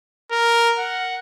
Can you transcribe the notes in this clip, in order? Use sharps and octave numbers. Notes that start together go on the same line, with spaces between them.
A#4
F#5